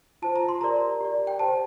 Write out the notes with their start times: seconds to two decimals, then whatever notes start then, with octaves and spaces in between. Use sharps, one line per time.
0.22 F4 C5 A5
0.36 A#5
0.49 C6
0.61 G4 A#4 D5 A#5
1.01 G4 D5
1.27 G5
1.39 G4 C5 A5